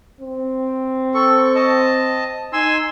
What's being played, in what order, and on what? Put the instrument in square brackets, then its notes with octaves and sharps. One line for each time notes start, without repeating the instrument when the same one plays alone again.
[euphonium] C4
[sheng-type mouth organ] A4 C#6
D#5 A5
[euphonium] D#4 [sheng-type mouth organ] G#5 C6 E6